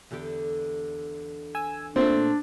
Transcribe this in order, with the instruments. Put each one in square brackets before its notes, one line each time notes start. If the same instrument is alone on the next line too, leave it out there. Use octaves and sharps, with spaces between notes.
[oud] E2 D3 G4
[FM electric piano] G#5 E6
[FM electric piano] A#2 A3 [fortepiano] C4 [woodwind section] D4